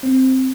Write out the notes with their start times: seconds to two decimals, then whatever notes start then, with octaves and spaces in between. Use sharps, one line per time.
0.03 C4